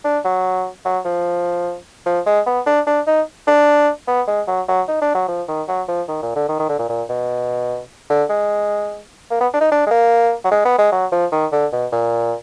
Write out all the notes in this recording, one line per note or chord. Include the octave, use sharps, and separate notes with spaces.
D4
F#3
F#3
F3
F3
G#3
B3
D4
D4
D#4
D4
B3
G#3
F#3
F#3
D#4
D4
F#3
F3
D#3
F#3
F3
D#3
A#2
D3
D#3
D#3
D3
A#2
A#2
B2
D3
G#3
A#3
B3
D4
D#4
D4
G#3
A#3
F#3
G#3
B3
G#3
F#3
F3
D#3
D3
B2
A#2